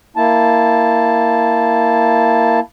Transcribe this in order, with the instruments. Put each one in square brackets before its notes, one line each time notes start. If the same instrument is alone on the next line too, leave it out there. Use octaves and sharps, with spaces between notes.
[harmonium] A#3 E4 A5